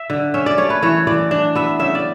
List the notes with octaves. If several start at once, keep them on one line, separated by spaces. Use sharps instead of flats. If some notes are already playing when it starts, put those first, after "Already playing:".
Already playing: E5
D3
C#4 E5
D5
A3 C#5
B4
E3 C#5
E3 D5
D4
B3 E5
C#3 E5
D5